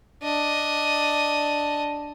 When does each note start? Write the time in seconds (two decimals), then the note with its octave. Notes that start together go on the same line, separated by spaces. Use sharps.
0.23 D4 D#5